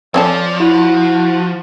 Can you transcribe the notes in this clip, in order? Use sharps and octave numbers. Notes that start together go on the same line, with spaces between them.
F3 C4 C#4 A4 D5
E4 F#4